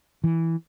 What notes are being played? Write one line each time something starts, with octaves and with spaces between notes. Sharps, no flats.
E3